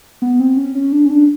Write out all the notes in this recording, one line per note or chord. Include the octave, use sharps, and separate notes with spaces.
B3
C4
C#4
C#4
D4
C#4
D4